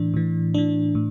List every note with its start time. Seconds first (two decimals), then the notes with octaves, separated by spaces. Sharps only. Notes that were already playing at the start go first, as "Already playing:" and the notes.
Already playing: A2 E3 D4
0.14 A2 E3
0.54 A2 E3 D4
0.95 A2